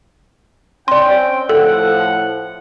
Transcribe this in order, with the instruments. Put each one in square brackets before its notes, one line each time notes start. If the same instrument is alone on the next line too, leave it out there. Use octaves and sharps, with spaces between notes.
[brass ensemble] C4 C#4 G5 [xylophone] D5 C6
[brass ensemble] A2 F3 F#5 [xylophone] A4